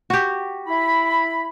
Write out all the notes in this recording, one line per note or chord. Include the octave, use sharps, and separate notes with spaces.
F#4 G4
E4 B5